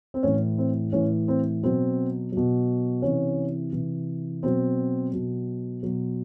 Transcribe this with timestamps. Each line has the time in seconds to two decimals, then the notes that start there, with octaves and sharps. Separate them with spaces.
0.14 C4
0.23 A2 E3 C#4
0.58 C4
0.93 A2 E3 C#4
1.28 C4
1.62 B2 F#3 C4
2.32 B2 F#3
3.02 C3 E3 C#4
3.73 C3 E3
4.43 B2 F#3 C4
5.12 B2 F#3
5.83 B2 F#3